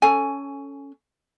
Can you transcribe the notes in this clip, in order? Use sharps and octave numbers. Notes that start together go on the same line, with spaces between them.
C#4 A4 G#5